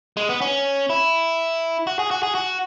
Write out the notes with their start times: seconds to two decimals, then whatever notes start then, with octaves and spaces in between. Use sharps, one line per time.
0.17 G#3
0.29 B3
0.42 C#4
0.90 E4
1.87 F#4
1.99 G#4
2.11 F#4
2.23 G#4
2.35 F#4